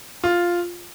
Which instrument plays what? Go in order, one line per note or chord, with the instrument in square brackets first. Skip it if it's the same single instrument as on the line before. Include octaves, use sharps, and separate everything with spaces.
[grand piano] F4